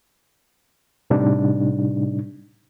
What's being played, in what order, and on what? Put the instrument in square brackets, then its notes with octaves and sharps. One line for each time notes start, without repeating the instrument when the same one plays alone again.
[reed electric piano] A2 C3 G3 D4 D#4